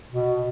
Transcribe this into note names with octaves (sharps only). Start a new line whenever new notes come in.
B2